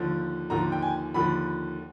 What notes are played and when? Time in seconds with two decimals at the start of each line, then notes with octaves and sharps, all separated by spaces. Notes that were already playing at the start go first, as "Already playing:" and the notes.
Already playing: D#2 D3 F3
0.50 D#2 D3 F3 A#5
0.72 G5
0.82 G#5
1.14 D#2 D3 F3 B5